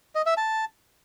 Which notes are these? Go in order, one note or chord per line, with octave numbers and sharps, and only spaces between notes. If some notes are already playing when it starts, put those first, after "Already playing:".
D#5
E5
A5